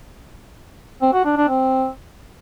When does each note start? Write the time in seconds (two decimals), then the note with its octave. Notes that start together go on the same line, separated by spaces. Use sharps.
1.02 C4
1.13 F#4
1.25 D4
1.37 D4
1.48 C4